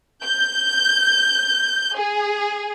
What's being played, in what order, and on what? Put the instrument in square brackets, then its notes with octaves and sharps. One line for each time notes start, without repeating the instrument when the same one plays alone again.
[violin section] G6
G#4